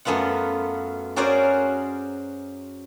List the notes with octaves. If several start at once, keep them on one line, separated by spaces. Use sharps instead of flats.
F#2 A3 B3 F4 F#5
C#4 F#4 G#4 A#4 C5 D5